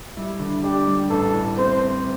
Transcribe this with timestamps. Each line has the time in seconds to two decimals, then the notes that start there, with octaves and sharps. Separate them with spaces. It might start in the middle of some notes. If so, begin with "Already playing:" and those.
0.17 G3 E4
0.40 D3
0.63 D4 G4
0.87 G3
1.10 A1 A4
1.34 A2
1.57 C4 C5
1.80 C4